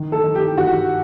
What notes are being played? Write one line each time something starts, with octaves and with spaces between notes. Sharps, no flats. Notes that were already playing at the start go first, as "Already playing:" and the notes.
Already playing: D#3
A4
D#3
G4
D#3 F#4